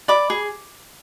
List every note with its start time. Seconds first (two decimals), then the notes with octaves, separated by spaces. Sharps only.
0.08 D5 B5 D6
0.30 G#4